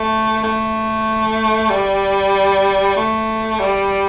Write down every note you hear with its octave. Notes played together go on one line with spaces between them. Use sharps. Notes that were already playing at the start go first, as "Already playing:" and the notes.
Already playing: A3
A3
G3
A3
G3